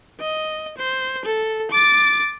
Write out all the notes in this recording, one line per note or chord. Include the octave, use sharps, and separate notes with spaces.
D#5
C5
A4
D6 A6